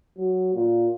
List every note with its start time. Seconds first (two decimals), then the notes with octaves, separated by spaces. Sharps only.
0.17 F#3
0.54 A#2